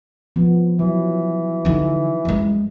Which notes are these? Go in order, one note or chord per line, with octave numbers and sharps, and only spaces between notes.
F3 B3
E3 F#3
D3 D#4
F#2 G#3